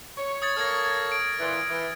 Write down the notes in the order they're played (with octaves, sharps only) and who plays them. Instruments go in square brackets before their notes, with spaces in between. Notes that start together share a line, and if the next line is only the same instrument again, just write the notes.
[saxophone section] C#5
[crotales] D#6 G#6 A6
[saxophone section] A#3 A4 C#5 [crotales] F6 G#6 A#6
[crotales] D7
[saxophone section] A#2 E3
E3